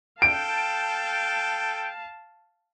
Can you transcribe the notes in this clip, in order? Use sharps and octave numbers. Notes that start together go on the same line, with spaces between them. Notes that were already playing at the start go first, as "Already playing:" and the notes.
A4 F5 G5 A5 D7